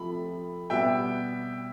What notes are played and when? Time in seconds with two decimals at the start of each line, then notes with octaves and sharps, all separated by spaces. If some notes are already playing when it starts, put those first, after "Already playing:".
Already playing: F2 C3 F3 A3 B5
0.70 B2 G3 B3 E5 G5